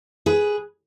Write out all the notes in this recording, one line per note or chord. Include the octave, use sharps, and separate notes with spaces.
G#4 B4